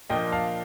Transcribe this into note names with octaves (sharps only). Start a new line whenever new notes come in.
A#2 F3 A#3 D4 D#5 G5
F5 A5